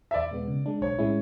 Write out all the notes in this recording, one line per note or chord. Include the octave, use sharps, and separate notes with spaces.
E5
E2 D5
B2 G#3 B3
C#3
G#3 D4
B1 C#5
A2 G#3 C#4 E4